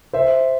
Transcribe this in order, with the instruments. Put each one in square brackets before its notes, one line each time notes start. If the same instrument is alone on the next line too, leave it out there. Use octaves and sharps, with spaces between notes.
[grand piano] C5 E5